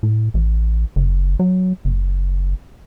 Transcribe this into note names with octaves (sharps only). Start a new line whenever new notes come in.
A2
A1
F#1
F#3
F#1